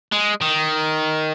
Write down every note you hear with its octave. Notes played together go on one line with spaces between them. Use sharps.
G#3
D#3